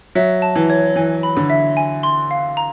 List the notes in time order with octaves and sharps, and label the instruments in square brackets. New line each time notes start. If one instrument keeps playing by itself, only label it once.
[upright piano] F#3 [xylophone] E5
[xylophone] A5
[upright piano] E3
[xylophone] C#5
[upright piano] E3 [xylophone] G#5
[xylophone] B5
[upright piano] D3
[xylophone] E5
G#5
C6
F5
A#5